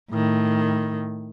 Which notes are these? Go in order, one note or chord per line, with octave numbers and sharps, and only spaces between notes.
A2 D#3